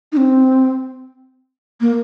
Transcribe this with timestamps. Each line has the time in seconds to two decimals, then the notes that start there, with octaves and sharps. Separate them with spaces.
0.12 D#4
0.17 C4
1.81 A#3